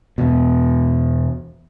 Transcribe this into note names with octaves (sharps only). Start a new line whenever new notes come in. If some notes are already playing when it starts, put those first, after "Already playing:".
E2 B2